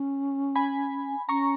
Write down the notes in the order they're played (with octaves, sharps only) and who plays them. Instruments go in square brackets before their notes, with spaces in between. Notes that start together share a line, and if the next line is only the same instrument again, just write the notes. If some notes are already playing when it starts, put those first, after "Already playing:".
Already playing: [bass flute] C#4
[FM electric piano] G#5 B5
[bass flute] C#4 [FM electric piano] A#5 C#6